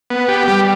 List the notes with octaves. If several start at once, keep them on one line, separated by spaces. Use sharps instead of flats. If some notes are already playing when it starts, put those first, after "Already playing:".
B3
G4
G3